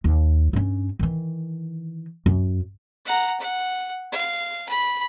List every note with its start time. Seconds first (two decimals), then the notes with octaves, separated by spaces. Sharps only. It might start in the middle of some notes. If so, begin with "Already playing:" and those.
0.04 D#2
0.53 G2 C#4
0.99 D#3 E3
2.26 F#2
3.05 F#5 A#5
3.40 F#5
4.12 F5
4.69 B5